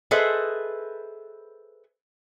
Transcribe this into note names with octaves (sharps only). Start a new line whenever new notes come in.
G#4 A4 B4 C5 D#5 E5